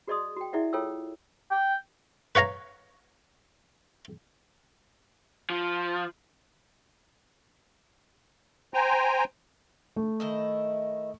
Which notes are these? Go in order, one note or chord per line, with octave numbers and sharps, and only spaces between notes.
F#4 G#4 D5 D#5 C6 D#6
F#4 G5
E4 G#4 D5 E5 F#5
F4 A4 C#5 G5 D6 E6
G5
B4 C#5 F5 A#5
F3
C5 G5 G#5 A#5
A3
D#3 E4 D#5